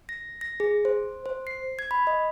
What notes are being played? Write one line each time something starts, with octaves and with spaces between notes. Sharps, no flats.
A#6
A#6
G#4
C5
C5
C7
G#6
B5
D#5